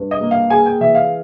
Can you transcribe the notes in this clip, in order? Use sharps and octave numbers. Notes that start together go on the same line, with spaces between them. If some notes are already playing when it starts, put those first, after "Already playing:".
Already playing: G2
D#5
A#3
F5
G#3 G#5
G5
E3 E5
F5